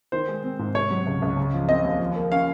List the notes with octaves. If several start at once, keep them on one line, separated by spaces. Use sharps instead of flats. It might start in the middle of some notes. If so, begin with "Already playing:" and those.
D#3 C5
G#3
C4
G#2
C3 C#5
F#3
C#2
C#2
C#3
F3
C4 D#5
D#2
F3
A#3
C#4 F5